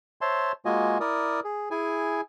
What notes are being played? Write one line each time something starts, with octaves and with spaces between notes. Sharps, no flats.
C5 C#5 E5 A5 C6
G#3 A#3 F4 F#4 D#5 G#5
E4 A#4 D5 D#6
G#4
E4 G#4 G#5